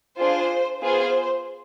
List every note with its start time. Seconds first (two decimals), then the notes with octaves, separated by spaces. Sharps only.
0.19 D4 F4 G#4 C5
0.81 B3 F4 G#4 C5